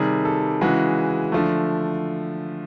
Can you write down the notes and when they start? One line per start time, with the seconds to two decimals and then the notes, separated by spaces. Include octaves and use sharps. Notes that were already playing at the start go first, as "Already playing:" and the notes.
Already playing: C3 D#3 G3 G#4
0.25 A4
0.61 C#3 E3 G#3 F#4
1.32 D3 F3 A3